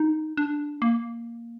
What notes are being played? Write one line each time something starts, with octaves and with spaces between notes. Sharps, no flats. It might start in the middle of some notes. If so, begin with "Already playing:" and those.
Already playing: D#4
D4
A#3